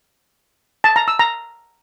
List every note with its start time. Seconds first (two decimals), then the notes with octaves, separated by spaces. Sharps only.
0.84 A5
0.96 A#5
1.08 E6
1.19 A#5